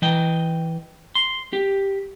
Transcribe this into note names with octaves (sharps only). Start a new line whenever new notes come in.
E3 D#5 G5
C6
G4